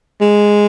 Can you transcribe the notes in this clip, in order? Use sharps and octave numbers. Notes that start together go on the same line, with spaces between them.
G#3